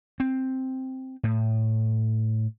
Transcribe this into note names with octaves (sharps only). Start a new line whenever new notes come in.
C4
A2